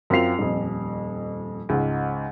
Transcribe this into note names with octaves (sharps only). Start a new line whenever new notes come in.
F#2 C4 F4 C7 F7
D#1 F2
C#2 G#2